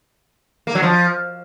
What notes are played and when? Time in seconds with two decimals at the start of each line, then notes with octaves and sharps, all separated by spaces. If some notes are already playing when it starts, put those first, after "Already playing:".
0.67 A#3
0.75 F#3
0.83 F3